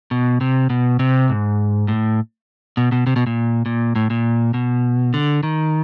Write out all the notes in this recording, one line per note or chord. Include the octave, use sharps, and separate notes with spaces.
B2
C3
B2
C3
G#2
A2
B2
B2
C3
B2
A#2
A#2
A2
A#2
B2
D3
D#3